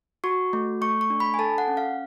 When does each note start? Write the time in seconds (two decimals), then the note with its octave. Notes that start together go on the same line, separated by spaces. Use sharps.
0.24 F#4 C#6
0.53 A3
0.81 A3 C#6
1.01 C#6
1.10 D4
1.20 B5
1.34 G#5
1.39 A4 A5
1.58 F#5
1.68 C#4
1.77 F5